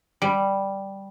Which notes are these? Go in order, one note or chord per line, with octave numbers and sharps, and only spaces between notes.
G3